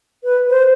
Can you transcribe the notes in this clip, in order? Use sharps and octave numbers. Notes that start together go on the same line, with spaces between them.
B4
C5